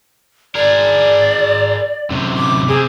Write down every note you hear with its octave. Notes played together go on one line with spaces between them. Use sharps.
G#4 A#4 D5
F#2 C3
D6
C3 G#4